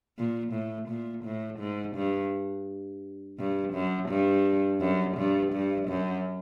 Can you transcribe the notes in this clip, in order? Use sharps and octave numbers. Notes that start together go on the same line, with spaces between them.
A#2
A2
A#2
A2
G#2
G2
G2
F#2
G2
F#2
G2
G2
F#2